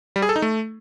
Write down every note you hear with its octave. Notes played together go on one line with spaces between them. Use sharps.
G3
G#4
A4
D#4
A3